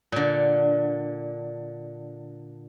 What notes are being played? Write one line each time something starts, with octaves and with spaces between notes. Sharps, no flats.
A#2 D3